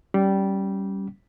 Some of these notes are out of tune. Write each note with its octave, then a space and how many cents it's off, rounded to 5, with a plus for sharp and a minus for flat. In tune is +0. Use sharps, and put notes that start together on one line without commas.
G3 -15 C#4 +0